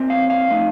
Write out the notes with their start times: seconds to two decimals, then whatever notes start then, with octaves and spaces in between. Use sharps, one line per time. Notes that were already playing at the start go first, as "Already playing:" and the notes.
Already playing: A#2 C4
0.10 F5
0.30 F5
0.50 D3 F3 A3 D#4